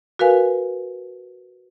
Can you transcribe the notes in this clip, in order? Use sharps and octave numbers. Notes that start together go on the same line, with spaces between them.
F#4 A#4 B4 F5 G#5